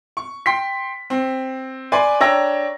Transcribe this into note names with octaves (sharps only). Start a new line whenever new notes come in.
C#6
G5 C6 B6
C4
B4 D5 G#5 C6
D4 C#5 G5 A#5 E6 A#6